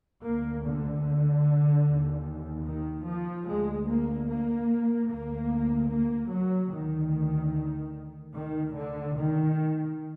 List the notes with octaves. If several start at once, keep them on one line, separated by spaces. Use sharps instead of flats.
D2 A#3
D3
D#2
D#3
F3
D2 G#3
A#3
A#3
D2 A#3
A#3
F#3
D2 D#3
D2 D#3
D3
D#3